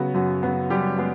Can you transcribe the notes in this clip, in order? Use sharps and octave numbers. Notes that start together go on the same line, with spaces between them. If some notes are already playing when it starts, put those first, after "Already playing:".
Already playing: C#3 F#3 B3 F#4
F#2 F#4
C#3 F#3 B3
F#2 G3 G4
G#3 B3 G#4